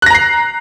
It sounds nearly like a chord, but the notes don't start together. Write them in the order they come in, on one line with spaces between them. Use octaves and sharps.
F#6 A#6 A#5 C7